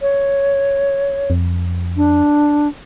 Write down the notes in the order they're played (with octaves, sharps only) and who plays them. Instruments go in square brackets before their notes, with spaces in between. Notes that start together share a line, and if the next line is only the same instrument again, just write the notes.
[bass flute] C#5
[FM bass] F2
[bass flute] D4